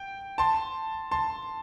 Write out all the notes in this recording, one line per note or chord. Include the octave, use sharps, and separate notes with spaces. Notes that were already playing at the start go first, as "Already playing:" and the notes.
Already playing: G5
A5 C6
A5 C6